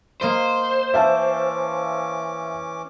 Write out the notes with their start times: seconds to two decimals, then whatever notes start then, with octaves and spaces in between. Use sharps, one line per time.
0.21 A#3 C5 D#5 C6
0.94 E3 C#4 E5 F5 A5 D6